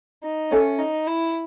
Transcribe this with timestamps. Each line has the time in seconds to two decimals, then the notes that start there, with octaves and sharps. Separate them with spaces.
0.24 D#4
0.51 C#4 A4 C#5 E5 G#5
0.79 D#4
1.07 E4